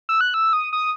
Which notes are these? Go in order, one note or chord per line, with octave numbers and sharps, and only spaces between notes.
E6
F#6
E6
D#6
D#6